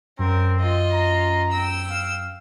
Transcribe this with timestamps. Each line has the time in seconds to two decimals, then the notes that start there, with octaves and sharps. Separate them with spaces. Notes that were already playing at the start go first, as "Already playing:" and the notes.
0.19 F#2 C4 A#4
0.60 F4 D#5
0.92 A#5
1.51 G5 E6
1.91 F5